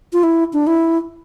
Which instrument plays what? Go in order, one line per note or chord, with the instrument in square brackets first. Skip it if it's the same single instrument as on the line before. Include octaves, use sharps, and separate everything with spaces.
[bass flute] F4
E4
D4
E4